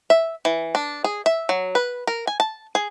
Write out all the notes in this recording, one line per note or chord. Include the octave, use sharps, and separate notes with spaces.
E5
E3
D4
G#4
E5
F#3
B4
A#4
G#5
A5
G#4